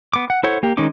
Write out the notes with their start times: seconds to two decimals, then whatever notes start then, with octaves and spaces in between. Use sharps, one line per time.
0.13 B3 D6
0.30 F#5
0.43 E4 A4 C5 C#5 F#5
0.63 A#3 G4
0.77 D#3 G#3 C#4 D#4 D6